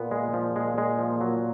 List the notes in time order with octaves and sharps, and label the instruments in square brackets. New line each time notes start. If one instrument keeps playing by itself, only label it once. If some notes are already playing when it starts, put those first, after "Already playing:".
Already playing: [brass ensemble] A#2 [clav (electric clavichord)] B3
[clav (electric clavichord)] G#3
F3
G#3
G#3
F3
F#3